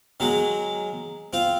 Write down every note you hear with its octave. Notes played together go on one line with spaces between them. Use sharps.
D#3 F#3 G#3
C4 F4